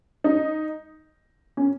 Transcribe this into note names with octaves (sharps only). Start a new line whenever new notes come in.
D#4
C#4